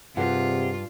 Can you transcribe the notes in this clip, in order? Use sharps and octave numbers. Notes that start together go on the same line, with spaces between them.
G2 C3 F4 G4 G#4 F#5